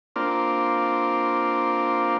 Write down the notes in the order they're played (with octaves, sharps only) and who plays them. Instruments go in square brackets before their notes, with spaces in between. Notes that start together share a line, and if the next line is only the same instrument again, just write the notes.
[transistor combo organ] A#3 C4 D4 F4